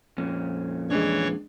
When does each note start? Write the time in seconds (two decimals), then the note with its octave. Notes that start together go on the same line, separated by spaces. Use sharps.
0.18 F2 A#2 C#4
0.90 E3 G#3 D4 C#5 C#6